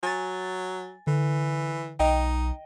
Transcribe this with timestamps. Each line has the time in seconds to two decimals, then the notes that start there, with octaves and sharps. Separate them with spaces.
0.03 F#3 G#5 A6
1.07 D3 E3
2.00 B1 D#4 D#5 G5